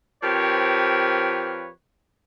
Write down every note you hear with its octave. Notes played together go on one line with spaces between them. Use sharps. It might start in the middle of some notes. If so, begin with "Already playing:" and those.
F3 C4 G4 A#4 B4 C#5